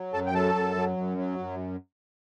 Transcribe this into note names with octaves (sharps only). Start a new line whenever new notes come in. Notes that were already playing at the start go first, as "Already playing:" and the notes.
Already playing: F#3
F#2 A4 A5
G5
F#3 A4 A5
F#2
F#3
F#2
F#3
F#2